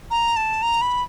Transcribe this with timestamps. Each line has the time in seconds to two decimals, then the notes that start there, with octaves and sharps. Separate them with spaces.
0.11 A#5
0.36 A5
0.62 A#5
0.82 B5